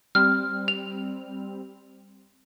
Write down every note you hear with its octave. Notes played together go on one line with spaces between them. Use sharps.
G3 C4 F6
F7